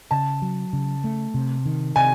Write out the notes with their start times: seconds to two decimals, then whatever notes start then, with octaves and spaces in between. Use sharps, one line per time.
0.11 C#3 A5
0.42 F#3
0.73 C#3
1.04 A3
1.34 C3
1.66 D#3
1.96 C3 G#5